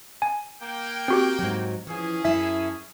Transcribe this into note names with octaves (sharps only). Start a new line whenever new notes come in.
G#5
A#3 G5
C4 F#4 G4
G#2 F#3
E3 F3 C#4 G#4
F#2 E4 E5 A5